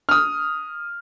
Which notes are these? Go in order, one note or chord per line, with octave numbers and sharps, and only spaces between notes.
D#6 F6